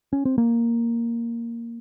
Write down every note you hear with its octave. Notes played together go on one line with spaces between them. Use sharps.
C#4
C4
A#3